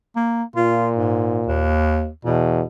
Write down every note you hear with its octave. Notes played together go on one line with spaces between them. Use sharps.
A#3
A#2 F4
G#2
D#2
E2 B2